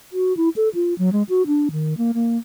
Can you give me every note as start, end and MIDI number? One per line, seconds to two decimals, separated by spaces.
0.13 0.36 66
0.37 0.49 64
0.56 0.69 69
0.75 0.94 65
0.98 1.12 54
1.12 1.23 56
1.29 1.46 66
1.47 1.69 62
1.72 1.97 51
1.98 2.12 58
2.14 2.37 58